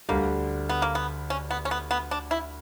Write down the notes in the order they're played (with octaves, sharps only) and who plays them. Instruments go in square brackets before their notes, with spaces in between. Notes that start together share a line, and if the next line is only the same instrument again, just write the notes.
[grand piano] D2 D3 G3 [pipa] A#3
[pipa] B3
A#3
B3
C#4
B3
C#4
B3
B3
D4
E4